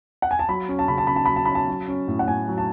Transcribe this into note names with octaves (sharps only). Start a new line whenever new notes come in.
F#5
G#5
A5
F#3 B5
C#4
A5
C#3 B5
A5
C#3 B5
A5
F#3 B5
A5
C#4 B5
A5
F#3
C#4
A2
F#5
A2 G#5
F#3
A5